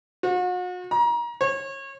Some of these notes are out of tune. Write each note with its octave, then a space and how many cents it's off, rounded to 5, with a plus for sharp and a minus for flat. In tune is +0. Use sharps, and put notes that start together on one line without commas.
F#4 -40
A#5 +30
C#5 -30